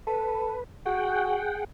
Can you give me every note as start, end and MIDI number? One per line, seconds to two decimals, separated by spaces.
0.07 0.55 69
0.07 0.64 71
0.86 1.38 66
0.86 1.64 68
0.86 1.64 78
0.86 1.64 79